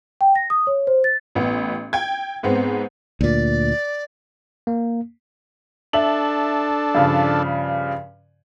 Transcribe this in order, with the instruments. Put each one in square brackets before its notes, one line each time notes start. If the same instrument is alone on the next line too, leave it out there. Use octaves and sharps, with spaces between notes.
[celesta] G5
A#6
D#6
C#5
C5
A6
[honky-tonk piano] A1 B3
G5 G#6
G#2 B3 C4
[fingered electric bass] D2 A#2 [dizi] D5
[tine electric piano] A#3
[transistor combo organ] D4 A4 [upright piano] E5 F#7
[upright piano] G2 C#3 F3